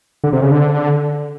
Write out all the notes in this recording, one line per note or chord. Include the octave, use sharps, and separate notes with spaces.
D3
C3
C#3
D3